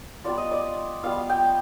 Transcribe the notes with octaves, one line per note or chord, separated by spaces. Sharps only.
G3 B3 F4 D5
D#5
D5
G3 B3 F4 F5
G5